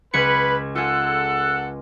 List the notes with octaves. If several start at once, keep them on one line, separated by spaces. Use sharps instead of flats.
C#2 B4 G#6 C#7
F4 G#4 A4 F#5